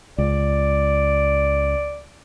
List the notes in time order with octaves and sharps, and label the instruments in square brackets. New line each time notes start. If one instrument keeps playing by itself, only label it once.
[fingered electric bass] C#2 [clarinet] D5